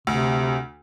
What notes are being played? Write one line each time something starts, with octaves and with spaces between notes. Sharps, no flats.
D2 C3